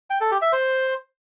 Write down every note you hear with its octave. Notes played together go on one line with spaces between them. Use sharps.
G5
A4
G4
E5
C5